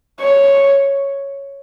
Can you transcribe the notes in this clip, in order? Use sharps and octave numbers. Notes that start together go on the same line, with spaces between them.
C#5